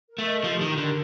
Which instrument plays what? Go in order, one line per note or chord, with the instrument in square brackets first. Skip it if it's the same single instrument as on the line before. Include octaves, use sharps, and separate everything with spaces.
[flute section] A#4
[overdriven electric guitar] A3
[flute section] D#5
[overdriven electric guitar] F3 [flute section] G4
[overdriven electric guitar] D#3 [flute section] G4
[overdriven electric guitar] D3 [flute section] A#4